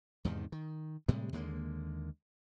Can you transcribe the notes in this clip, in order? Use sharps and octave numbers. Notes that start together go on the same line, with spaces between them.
E2 G#2 C3 D#3
D#3
A2 C3 G3 G#3
D#2 D3 G#3 A#3